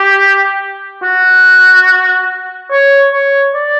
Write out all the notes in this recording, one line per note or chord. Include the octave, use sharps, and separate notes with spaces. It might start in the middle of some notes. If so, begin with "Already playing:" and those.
Already playing: G4
F#4
C#5
C#5
D5